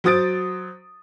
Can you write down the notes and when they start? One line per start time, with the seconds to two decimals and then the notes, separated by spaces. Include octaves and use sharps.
0.04 F#3 C5 D#6 A6 D7